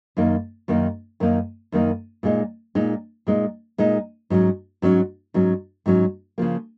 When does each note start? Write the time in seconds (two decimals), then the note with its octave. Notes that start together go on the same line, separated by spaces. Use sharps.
0.17 F#2 D#3 A#3 D#4
0.68 F#2 D#3 A#3 D#4
1.20 F#2 D#3 A#3 D#4
1.72 F#2 D#3 A#3 D#4
2.23 A#2 G#3 D#4
2.75 A#2 G#3 D#4
3.27 A#2 G#3 D#4
3.78 A#2 G#3 D#4
4.30 G#2 F#3 C#4
4.82 G#2 F#3 C#4
5.34 G#2 F#3 C#4
5.86 G#2 F#3 C#4
6.38 C#3 F3 A#3